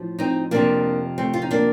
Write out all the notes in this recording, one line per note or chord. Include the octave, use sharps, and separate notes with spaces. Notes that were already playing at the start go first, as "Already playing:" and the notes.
Already playing: A2 F3
C4 D#4
F2 C3 F3 A#3 D4
A3 C4
F4
D#4
A#3 D4